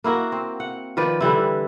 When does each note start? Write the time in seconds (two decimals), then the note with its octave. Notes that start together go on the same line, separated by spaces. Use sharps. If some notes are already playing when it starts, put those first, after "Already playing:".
0.04 A#3 E4 F#4 A#4
0.32 C4
0.60 F#5
0.97 D#3 F3 B4 D5
1.20 D3 E3 G3 E4